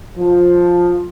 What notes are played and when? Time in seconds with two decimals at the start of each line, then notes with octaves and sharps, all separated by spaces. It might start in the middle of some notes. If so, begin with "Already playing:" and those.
0.16 F3